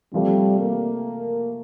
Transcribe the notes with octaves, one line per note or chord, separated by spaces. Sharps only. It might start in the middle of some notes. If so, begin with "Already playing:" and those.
C3 F3 G3 A3
A#3